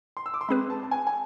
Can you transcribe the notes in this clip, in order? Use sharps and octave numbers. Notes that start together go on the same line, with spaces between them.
C6
E6
D6
C6
G#3 C4 G#4 B4 B5
A5
A5
G#5
G#5